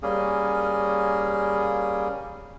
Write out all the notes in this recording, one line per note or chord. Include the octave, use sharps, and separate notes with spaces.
G3 A#3 C#4 G#4